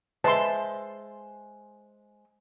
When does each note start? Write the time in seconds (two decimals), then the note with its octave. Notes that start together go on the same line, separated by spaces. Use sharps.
0.24 G#3 B4 C5 E5 A5 C6